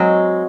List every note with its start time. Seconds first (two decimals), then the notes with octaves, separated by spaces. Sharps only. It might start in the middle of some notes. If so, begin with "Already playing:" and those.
Already playing: F#3 G#3 C4